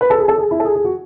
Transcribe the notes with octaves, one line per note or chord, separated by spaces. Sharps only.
B4
A4
G#4
A4
G#4
E4
A4
G#4
G#4
F#4